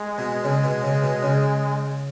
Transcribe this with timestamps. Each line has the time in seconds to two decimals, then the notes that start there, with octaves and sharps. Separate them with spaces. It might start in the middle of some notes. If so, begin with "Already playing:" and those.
Already playing: G#3
0.18 B2
0.44 C#3
0.63 B2
0.83 C#3
1.03 B2
1.23 C#3